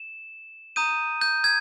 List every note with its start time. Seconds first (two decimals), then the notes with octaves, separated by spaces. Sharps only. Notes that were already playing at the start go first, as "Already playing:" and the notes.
Already playing: E7
0.76 A#5 D#6 G6 D#7
1.21 G6
1.44 G#6